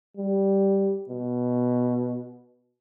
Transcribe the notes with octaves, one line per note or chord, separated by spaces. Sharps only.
G3
B2